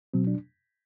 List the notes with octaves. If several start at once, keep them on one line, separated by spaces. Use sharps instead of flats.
B2 F#3 C4
D4